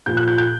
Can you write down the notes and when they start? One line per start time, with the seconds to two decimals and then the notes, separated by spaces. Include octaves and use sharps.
0.06 A#2 F3 G6
0.17 F#6
0.28 G6
0.38 G6